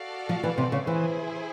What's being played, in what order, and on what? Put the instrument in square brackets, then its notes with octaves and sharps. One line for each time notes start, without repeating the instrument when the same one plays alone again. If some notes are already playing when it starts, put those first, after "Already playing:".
Already playing: [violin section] F#4 A4 D5 F5
[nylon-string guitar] F3
E3
C3
C#3
[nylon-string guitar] E3 [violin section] E4 G#4 C5